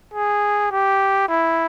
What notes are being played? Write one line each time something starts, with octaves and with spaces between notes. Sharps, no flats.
G#4
G4
E4